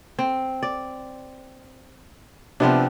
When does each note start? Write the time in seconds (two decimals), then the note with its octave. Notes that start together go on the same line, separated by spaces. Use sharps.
0.19 C4
0.63 D5
2.60 C3 F3 B3 C4 D4